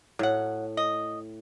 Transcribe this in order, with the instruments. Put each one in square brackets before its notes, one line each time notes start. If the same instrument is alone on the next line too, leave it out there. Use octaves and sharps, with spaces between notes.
[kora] A2 [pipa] F#3 F#5
[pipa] D#5